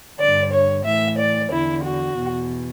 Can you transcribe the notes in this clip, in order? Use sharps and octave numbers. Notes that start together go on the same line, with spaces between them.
G2 D3 D5
C#5
A2 E3 E5
D5
E2 D3 E4
F#4
E2 B2